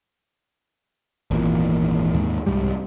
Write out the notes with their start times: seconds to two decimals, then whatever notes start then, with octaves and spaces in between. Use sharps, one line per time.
1.31 G#1 E2 A#2
2.14 D#2 G#2
2.46 C2 F2 G#2 G3